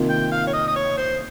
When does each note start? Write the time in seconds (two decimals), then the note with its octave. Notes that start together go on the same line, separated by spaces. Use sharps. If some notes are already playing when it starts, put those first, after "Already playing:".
Already playing: C3 D#3 A#3 F4
0.09 G5
0.32 F5
0.47 C#5
0.54 D#5
0.68 D#5
0.76 C#5
0.98 C5